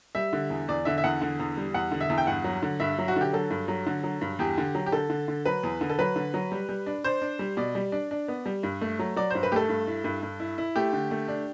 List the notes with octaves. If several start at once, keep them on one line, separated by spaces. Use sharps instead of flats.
G3 E5
D3
E2
E2 D5
D3 E5
E5
E2 F#5
D3
E2
G3
E2 F#5
D3
E5
E2
G5
G2 F#5
F#3
D3
G2 E5
F#3
F#4
D3 G4
F#3 A4
G2
F#3
D3
F#3
G2
E2 G4
D3
F#3
G4
D3 A4
D3
D3
F#3 B4
E2
D3
A4
F#3 B4
D3
F#3
G3
G3
D4
D4 C5
D4
G3
B2 D5
G3
D4
D4
B3
G3
G2
A3
F#3
F#3 D5
G2 C5
B4
A3 G4 A4
G2
E4
G2
G2
E4
E4
A3 G4
D3
A3
D4